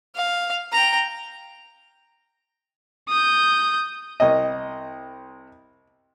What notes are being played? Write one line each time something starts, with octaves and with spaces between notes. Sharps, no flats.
F5
G5 A#5
D#6 G6
C2 D#5